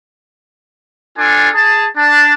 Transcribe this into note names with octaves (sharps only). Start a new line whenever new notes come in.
D4 F4 A4 G#5
G#4 A5
D4 A5